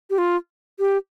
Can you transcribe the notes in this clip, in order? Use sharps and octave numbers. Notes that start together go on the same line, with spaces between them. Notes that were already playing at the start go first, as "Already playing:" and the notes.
G4
F4
G4